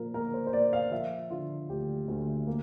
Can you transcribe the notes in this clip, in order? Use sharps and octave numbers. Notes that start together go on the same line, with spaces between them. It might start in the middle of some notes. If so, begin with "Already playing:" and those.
Already playing: A#2 F3 A#4
A#3 A#4
C5
C5
A#2 D5
F5
F3 E5
D3 F4
D2 G4
D2
A#3